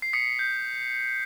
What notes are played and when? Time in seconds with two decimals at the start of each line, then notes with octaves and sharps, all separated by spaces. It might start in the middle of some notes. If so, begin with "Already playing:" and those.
0.02 C7
0.13 D#6 B6 C#7
0.39 G6